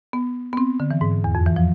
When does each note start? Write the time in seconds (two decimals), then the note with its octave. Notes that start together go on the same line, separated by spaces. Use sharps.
0.13 B3
0.53 B3
0.57 C4
0.80 D3
0.91 E3
1.01 G#2
1.24 E2
1.35 F2
1.46 E3
1.56 F3